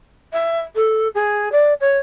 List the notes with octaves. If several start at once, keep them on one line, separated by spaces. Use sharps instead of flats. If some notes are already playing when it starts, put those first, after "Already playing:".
E5
A4
G#4
D5
C#5